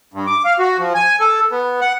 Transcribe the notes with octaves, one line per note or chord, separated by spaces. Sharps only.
G2
D6
F5
F#4
F3
G#5
A4
B3
F#5